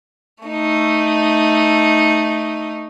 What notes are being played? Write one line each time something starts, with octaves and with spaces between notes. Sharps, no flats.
A3 D#4